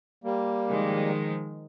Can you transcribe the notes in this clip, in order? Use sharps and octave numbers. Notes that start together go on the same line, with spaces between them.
G3 A#3
D#3 F3 G#3